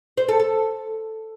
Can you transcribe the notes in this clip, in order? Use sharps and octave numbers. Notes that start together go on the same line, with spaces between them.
C5
A4
A4